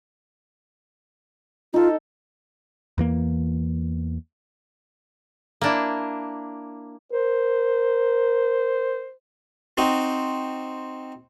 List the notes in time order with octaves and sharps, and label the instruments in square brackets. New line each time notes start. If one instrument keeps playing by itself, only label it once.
[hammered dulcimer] D#4 A4 [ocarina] F4
[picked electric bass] E2 E3 A#3
[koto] A#3 D4 E4
[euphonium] A#4 [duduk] C5
[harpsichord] C4 D#4 F#4